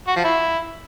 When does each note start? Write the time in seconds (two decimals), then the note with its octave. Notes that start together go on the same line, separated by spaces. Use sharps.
0.08 F#4
0.16 F3
0.24 E4